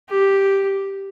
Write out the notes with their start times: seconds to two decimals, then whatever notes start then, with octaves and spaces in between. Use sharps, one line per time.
0.09 G4